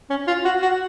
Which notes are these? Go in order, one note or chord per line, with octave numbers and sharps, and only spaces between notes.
C#4
F4
F#4
F#4